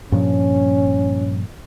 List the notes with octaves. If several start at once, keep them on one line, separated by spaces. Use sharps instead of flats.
G2 A#2 F3 C#4